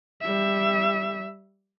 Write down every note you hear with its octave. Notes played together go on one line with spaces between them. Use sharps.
G3 E5